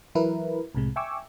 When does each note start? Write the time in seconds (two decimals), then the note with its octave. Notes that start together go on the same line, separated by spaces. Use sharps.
0.15 E3 F#3 E4 A#4 B4
0.75 C2 A2 C3 G#3
0.96 E5 G5 G#5 C#6 D6 E6